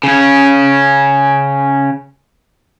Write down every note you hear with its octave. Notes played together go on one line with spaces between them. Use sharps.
C#3 C#4